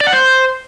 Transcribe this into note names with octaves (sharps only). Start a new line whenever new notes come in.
D5
F#5
C5